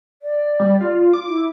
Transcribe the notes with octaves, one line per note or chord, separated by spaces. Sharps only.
D5
G3
F4
D6
E4